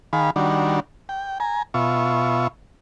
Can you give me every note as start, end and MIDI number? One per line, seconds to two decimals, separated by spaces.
0.13 0.30 51
0.13 0.30 68
0.13 0.30 77
0.13 0.30 83
0.36 0.80 51
0.36 0.80 55
0.36 0.80 62
0.36 0.80 66
1.09 1.38 79
1.40 1.63 80
1.40 1.63 82
1.74 2.47 47
1.74 2.47 65
1.74 2.47 76
1.74 2.47 85